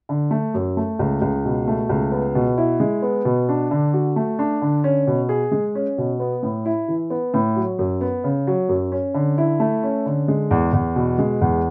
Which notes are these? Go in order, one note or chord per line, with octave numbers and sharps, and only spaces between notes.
D3
A3
F#2
A3
C#2
C#2
B2
A3
C#2
B3
B2
E4
G#3
B3
B2
D4
D3
F#4
A3
D4
D3
C#4
B2
G#4
G#3
C#4
B2
B3
A2
E4
E3
B3
A2
F#3
F#2
B3
C#3
F#3
F#2
C#4
D3
E4
A3
C#4
D3
G#3
E2
E2
B2
G#3
E2